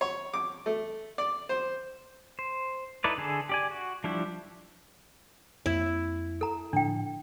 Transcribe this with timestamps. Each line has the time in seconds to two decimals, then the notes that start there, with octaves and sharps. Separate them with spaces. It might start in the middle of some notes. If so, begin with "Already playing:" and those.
0.01 C#5
0.34 D6
0.66 A3
1.18 D5
1.49 C5
2.39 C5
3.04 D#4 E4 A4 B4 D5
3.18 D3 G#4 A4
3.49 G4 D5 G#5
3.71 F#4
4.04 F3 G3 D4 E4 G4
5.66 F2 A#3 E4
6.41 A4 A#5
6.73 A2 D3 F3 D4 G5